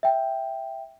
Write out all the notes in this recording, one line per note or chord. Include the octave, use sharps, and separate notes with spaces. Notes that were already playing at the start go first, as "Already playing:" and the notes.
E5 G5